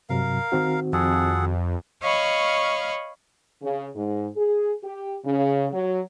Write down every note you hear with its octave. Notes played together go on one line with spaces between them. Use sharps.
G2 C3 F#3 A#4 F5
D#3 C4 F#4
F2 G#4 A4 F#5
C#5 D#5 F5 B5 C#6
C#3
G#2
G#4
G4
C#3
F#3